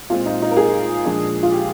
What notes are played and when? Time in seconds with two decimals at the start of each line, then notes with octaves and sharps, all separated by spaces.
0.10 A#2 G#3 C4 F4
0.26 D#4
0.42 D#4
0.51 A#4
0.57 G#4
1.05 A#2 F3 G#3 D4
1.43 F4
1.51 G4